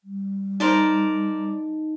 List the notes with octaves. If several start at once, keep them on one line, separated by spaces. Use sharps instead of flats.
G3
D#4 A#4 C5 D5